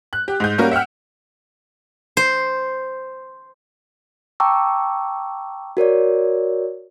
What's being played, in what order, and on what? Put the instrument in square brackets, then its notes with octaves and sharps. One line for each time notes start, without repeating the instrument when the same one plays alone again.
[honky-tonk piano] F#6
G4
G#2 G6
G3 A#3 C#4 F#4 A#4
E5 F#5 G5 F6
[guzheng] C5
[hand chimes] G5 A5 A#5 C#6 D6 E6
F#4 A#4 C#5 D5